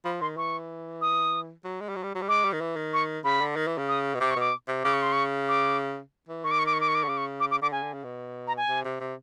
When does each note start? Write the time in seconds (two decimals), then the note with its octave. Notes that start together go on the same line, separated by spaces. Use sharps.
0.04 F3 B5
0.21 D#3 C6
0.36 E3 C#6
1.01 D#6
1.64 F#3
1.81 G#3
1.89 G3
1.96 F#3
2.03 G3
2.15 F#3
2.22 G3
2.29 G#3 D6
2.45 G3
2.53 D#3
2.61 E3
2.76 D#3
2.93 C#6
3.24 C#3 B5
3.41 D3
3.56 D#3
3.67 E3
3.78 C#3
3.89 D#6
4.14 B2
4.20 C3 D6
4.31 C#6
4.36 B2 D6
4.68 C3
4.84 C#3 D6
4.93 C#6
5.02 C6
5.12 C#6
5.48 D6
6.29 E3
6.44 D#3 C#6
6.51 D6
6.59 C#6
6.66 D6
6.73 C#6
6.81 D6
6.88 C#6
6.95 D6
7.03 D3 C#6
7.08 C#3 D6
7.17 C#6
7.40 D6
7.51 D6
7.62 D3 D6
7.72 C#3 G#5
7.83 D3
7.93 C#3
8.04 B2
8.47 A#5
8.57 G#5
8.68 C3
8.84 C3
9.00 C3